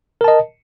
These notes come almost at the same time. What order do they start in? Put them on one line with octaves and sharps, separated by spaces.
A#4 A5 D#5